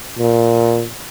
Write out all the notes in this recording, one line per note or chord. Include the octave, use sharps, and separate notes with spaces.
A#2